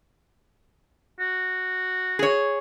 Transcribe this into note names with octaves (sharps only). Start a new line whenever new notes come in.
F#4
G#4 C#5